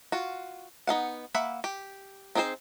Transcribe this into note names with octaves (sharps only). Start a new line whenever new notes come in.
F4 F#4
B3 D#4 F5 F#5
A#3 E5 F#5 B5
G4
C4 D#4 G#4 A#4 C5